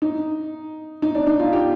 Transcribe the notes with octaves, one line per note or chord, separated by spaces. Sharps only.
D#4
D#4
D4
D#4
F4
G4